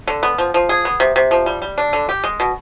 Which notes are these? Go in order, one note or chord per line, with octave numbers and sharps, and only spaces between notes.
D3
B3
F3
F3
G#4
B3
C3
C3
F3
G3
G3
D4
D3
G4
G#3
B2